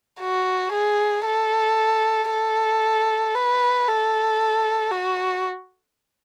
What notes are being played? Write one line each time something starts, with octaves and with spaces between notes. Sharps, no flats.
F#4
G#4
A4
A4
B4
A4
F#4